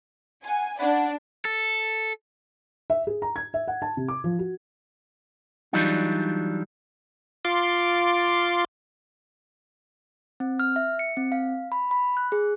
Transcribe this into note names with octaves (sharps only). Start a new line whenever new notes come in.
F4 F#5 G#5
C#4 D4 D5 F#5 B5
A4
E5
G#4
A#5
G#6
E5
F#5
A5
C3
D6
F3
F#4
E3 F#3 G3 D4 D#4 F4
F4 C6 D6
C4
F6
E5
C#7
C4
F5
B5
B5
F#6
G#4